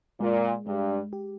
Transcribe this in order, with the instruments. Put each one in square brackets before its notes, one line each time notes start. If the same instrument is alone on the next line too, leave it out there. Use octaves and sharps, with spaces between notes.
[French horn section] A#2 [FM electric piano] G#3
[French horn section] G2 [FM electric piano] G#3
[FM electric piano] G4